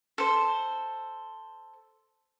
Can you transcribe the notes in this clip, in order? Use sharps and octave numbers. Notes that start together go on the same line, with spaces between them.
A4 C5